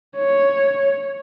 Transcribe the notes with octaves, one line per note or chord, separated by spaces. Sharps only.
C#5